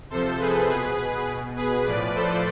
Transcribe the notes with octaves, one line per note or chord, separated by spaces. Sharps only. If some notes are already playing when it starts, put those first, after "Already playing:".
C3 F3 A4 C5
G#4 B4
B2 G#4 B4
B2
G#4 B4
A2 F3 B4 D5
A4 C5